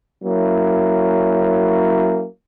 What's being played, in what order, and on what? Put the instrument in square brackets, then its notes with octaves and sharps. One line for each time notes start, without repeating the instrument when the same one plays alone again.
[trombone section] F#3 A#3 C#4 E4